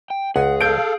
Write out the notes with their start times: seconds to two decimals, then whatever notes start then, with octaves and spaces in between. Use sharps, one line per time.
0.10 G5
0.36 C#2 G#4 F#5
0.61 A4 F5 G6 D7